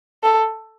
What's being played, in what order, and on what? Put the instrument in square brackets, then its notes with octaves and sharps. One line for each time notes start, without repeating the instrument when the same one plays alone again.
[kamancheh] A4